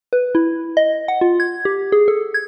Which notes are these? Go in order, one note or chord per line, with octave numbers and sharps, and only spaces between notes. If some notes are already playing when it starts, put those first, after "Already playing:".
B4
E4
D#5
F#5
F4
G#6
G4
G#4
A4
G#6